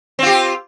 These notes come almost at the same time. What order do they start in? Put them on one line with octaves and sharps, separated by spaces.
C4 F4 G4